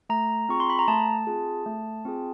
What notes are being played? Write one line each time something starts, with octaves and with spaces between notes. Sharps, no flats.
A3 A#5
C4 F4 G#4 C#6
C6
B5
A#5
A3 A5
C4 F4 G#4
A3
C4 F4 G#4